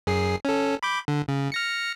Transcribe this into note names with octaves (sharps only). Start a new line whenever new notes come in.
F#2 G#4 C7
C#4 A4
B5 D6 G6
D3
C#3
F6 A#6 C#7